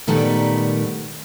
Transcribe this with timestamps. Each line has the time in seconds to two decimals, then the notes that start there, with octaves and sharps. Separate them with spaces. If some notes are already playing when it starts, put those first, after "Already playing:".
0.07 A#2 D#3 G3 A3 B3